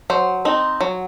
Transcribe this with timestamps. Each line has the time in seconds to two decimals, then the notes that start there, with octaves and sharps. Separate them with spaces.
0.10 F#3 C5
0.45 C4 D#4
0.81 F#3